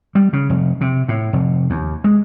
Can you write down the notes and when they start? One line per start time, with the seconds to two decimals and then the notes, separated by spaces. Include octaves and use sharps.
0.15 G3
0.33 C#3
0.50 F1
0.81 C3
1.08 A2
1.33 F1
1.70 D#2
2.04 G#3